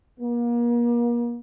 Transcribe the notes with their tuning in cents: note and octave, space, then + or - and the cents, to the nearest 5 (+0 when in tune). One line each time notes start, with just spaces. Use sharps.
A#3 +35